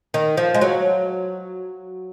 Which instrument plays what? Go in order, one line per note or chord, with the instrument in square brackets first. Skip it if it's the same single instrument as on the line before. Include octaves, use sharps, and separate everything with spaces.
[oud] D#3
F3
G#3
F#3